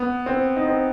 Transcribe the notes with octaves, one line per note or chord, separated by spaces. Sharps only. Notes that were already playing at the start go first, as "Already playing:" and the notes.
Already playing: B3
C4
D#4
C4